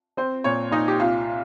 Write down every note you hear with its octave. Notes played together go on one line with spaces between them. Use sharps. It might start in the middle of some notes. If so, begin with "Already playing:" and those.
C4 C5
A#2 C#5
A#2 D#4
G4
C2 F4